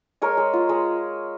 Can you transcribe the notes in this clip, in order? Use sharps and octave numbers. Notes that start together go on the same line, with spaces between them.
G#3 A#4 C#5
G#3
F4
G#3